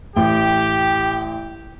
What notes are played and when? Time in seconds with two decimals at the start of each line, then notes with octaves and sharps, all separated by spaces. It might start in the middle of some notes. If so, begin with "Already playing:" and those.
0.16 A1 G4 G5